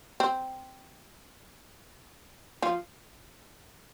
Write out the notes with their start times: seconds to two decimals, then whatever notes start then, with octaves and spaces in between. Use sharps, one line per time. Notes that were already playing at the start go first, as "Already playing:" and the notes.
0.20 C4
2.62 F3 F4